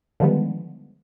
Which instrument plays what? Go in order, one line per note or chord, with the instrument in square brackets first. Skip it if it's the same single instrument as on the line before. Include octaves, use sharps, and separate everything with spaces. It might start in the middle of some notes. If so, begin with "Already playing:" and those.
[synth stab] D3 D#3 F3 G3 G#3 B3